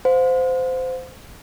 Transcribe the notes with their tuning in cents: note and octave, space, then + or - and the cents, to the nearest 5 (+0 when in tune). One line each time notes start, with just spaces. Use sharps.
C5 -20 F5 +40